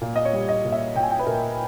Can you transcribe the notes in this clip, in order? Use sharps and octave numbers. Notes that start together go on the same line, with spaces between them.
A#2
D#5
C#5
G3
D#5
A#2
E5
A#2 G5
G#5
G5
B4
A#2 A#4